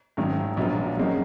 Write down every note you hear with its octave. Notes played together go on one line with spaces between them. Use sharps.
G#1 F#2 D#3
A#1 A#2 F#3 B3 F4
F2 C#3 F#3 A#3 D#4